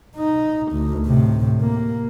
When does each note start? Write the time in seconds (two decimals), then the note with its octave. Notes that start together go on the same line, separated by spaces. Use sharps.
0.16 D#4
0.72 D2
1.06 A2 C3
1.61 A#3